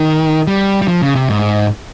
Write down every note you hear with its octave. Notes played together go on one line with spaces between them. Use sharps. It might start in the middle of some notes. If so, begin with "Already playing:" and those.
Already playing: D#3
G3
G3
F3
C#3
C3
G#2